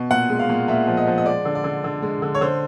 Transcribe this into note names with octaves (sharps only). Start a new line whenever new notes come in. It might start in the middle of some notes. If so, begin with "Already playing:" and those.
Already playing: B2
A#2 F#5
G#3
F5
A#2
A#2 E5
F3
D#5
F3
D#5
G#3 D5
D3
D5
D3
D3
G#3
D3
C#5
D3 C5